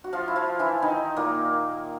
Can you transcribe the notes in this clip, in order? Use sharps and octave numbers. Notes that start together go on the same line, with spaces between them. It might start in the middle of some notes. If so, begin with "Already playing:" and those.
F#4
F3 F4
E4
F3 F4
E3 E4
D#3 D#4
A#2 A#3